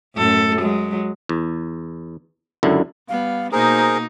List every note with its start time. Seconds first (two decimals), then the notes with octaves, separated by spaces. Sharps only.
0.15 F#2 A2 A4
0.60 F#3 G#3
1.29 E2
2.63 C#2 F#2 D3 E4
3.09 G3 B3 F5
3.52 B2 A#3 D#4 G#4 A#4 C5